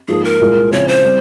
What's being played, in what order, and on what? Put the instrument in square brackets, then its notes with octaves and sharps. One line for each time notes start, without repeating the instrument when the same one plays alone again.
[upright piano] G#2 F3 A#3 [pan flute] G#4
[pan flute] A#4
[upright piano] C2 A#2 G#3
[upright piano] C#3 F3 C4 E4 [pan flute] C#5
[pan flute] C5
[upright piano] G3 C4